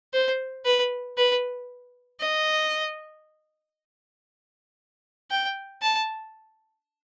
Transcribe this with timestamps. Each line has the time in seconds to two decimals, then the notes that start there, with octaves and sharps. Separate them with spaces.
0.14 C5
0.65 B4
1.18 B4
2.21 D#5
5.31 G5
5.82 A5